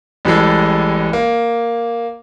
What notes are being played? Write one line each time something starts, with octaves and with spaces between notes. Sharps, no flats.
A1 E3 G3 G#3 A4
A#3